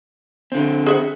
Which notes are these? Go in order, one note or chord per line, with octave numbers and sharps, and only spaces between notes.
D3 C4
G#4 E5 F#5